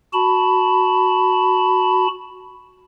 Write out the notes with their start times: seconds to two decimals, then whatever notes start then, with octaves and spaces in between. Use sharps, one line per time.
0.13 F#4 A5 B5